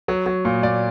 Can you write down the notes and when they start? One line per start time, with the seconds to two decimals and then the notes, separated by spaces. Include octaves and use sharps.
0.08 F#3
0.26 F#3
0.45 A#2
0.63 A#2 D5